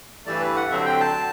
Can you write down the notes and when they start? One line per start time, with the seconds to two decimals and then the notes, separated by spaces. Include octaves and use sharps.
0.26 G2 E3 A3 D5
0.41 B4
0.56 F#5
0.71 D3 F#3 C4 E5
0.86 G5
1.00 A5